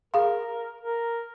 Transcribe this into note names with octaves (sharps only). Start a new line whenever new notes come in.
G#4 A#4 F5
A#4